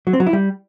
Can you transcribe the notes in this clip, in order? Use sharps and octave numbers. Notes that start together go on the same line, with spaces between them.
F#3
C4
F#3
E4
G3